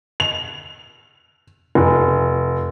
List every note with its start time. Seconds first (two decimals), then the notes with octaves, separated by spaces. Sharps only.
0.20 F7
1.75 F1